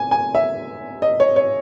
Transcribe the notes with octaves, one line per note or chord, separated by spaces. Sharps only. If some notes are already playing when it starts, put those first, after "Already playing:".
Already playing: G#5
G#5
E5
D#5
C#5
C#5